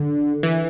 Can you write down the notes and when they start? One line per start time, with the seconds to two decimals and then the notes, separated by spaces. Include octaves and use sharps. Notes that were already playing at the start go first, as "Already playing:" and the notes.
Already playing: D3
0.43 E3